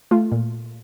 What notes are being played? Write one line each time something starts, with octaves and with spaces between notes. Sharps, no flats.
A3 F4
A#2